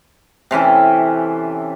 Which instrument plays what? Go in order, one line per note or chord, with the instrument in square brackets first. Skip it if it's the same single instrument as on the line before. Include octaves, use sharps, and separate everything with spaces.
[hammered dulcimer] C3 E3 C#4 A4